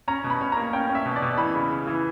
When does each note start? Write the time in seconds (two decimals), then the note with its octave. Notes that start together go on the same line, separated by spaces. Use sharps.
0.08 C#4 A#5
0.24 B2
0.30 B5
0.41 C#4
0.52 A#5
0.57 A#3
0.73 C#4 G5
0.89 C#4
0.95 E5
1.06 B2
1.16 D5
1.22 B2
1.38 E3 B5
1.55 C#3
1.71 C#3
1.87 E3